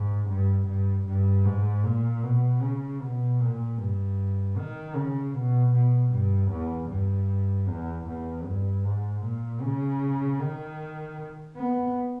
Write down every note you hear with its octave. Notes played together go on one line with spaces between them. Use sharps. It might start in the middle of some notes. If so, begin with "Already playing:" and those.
Already playing: G#2
G2
G2
G2
G#2
A#2
B2
C#3
B2
A#2
G2
D#3
C#3
B2
B2
G2
E2
G2
E2
E2
G2
G#2
A#2
C#3
D#3
B3